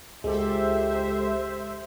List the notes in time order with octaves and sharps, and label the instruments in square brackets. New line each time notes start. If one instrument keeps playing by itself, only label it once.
[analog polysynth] C#2 G4 A4 [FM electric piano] G#3 [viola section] C5 E5